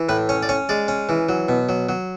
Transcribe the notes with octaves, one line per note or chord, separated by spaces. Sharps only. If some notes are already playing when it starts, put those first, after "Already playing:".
Already playing: E3
A2 B4
C#4 C#5
D5
C#4 C#5
G#3 D5
C#4
E3
F#3
B2
F#3
F#3